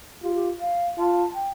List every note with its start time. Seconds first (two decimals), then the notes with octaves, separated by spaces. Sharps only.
0.23 F4 G4
0.35 G4
0.60 F5
0.98 F4 A5
1.35 G5